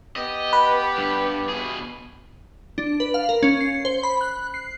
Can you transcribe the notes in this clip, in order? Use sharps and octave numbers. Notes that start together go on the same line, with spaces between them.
B3 G4 D#5
B4
G2
B2 G#4
D4
B4
F5
A#4
C#4
C7
C5
B5
F#6
C7